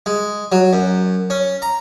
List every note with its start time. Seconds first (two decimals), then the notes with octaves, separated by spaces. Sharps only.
0.06 G#3
0.52 F#3
0.73 F#2
1.30 C#4
1.62 A#5